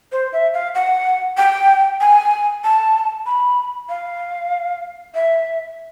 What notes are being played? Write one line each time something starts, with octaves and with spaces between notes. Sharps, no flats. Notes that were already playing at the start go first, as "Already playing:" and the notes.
C5
E5
F5
F#5
G5
G#5
A5
B5
F5
E5